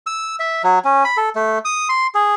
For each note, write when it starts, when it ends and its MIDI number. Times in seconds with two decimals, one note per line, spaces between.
0.07 0.36 88
0.39 0.62 76
0.64 0.79 54
0.85 1.04 61
1.05 1.17 83
1.17 1.29 69
1.35 1.58 57
1.65 1.88 87
1.89 2.07 84
2.15 2.35 68